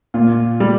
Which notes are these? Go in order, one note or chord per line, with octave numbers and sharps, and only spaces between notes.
A#2 F4
G3